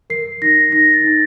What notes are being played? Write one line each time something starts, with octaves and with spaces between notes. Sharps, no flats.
A#4 C7
D#4 A#6
D#4 A#6
A6
D#4